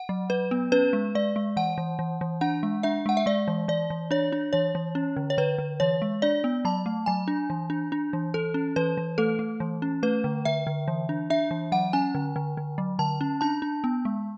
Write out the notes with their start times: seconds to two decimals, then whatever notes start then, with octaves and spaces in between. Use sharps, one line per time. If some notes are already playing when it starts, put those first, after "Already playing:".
Already playing: F#5
0.09 F#3
0.30 F#3 B4
0.51 B3
0.72 C#4 B4
0.93 G#3
1.15 G#3 D5
1.36 G#3
1.57 E3 F#5
1.78 E3
1.99 E3
2.21 E3
2.41 D4 F#5
2.63 G#3
2.83 D4 E5
3.06 G#3 F#5
3.17 E5
3.26 G#3 D5
3.48 E3
3.68 E3 D5
3.90 E3
4.11 D4 C#5
4.32 D4
4.53 E3 C#5
4.75 E3
4.95 C#4
5.16 D3
5.30 C#5
5.38 D3 B4
5.58 D3
5.80 E3 C#5
6.02 G#3
6.22 D4 D5
6.44 B3
6.65 F#3 A5
6.86 A3
7.06 F#3 G#5
7.28 D4
7.50 E3
7.70 D4
7.92 D4
8.13 E3
8.34 E3 A4
8.54 C#4
8.76 E3 B4
8.97 E3
9.18 A3 A4
9.39 A3
9.60 E3
9.82 C#4
10.03 A3 B4
10.24 D3
10.45 D3 E5
10.67 D3
10.88 E3
11.09 D4
11.30 D4 E5
11.51 E3
11.72 F#3 F#5
11.93 C#4 G#5
12.15 D3
12.36 D3
12.57 D3
12.78 F#3
12.99 D3 A5
13.21 C#4
13.41 D4 A5
13.62 D4
13.84 B3
14.05 G#3